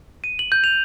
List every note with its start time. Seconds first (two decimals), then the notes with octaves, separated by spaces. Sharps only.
0.24 D#7
0.39 F#7
0.52 G6
0.64 F7